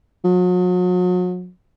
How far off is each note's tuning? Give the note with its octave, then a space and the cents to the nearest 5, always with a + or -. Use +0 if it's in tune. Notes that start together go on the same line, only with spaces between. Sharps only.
F#3 -40